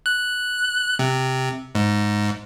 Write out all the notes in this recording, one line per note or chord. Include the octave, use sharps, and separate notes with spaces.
F#6
C3
G#2